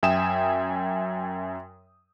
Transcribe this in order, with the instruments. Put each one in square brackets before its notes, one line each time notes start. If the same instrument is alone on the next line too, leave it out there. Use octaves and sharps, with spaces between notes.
[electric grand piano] F#2 E5 G5 G#5 D#6 E7